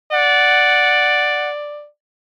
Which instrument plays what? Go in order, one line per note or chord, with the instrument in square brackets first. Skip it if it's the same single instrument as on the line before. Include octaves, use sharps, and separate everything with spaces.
[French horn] D5 [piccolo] F#5